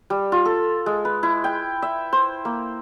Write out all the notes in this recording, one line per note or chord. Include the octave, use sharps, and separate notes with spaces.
G3
F4
A4
G#3
B4
E4
G5
E5
C5
A#3